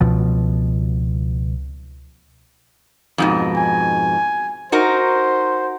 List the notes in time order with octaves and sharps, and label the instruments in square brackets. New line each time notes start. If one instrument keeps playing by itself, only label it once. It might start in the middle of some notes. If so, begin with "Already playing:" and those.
[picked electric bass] C#2 B2 F3
[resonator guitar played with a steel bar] F2 G#2 B2
[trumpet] G#5
[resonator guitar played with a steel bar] D#4 F#4 A#4 [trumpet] C5